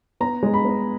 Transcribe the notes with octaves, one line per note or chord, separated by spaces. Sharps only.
B3 A#5
G#3
B5
B3